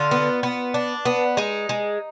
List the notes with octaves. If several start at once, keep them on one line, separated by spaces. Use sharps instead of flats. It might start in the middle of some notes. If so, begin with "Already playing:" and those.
Already playing: D3 F4
B3
B3
D4
B3
G#3 D#4
G#3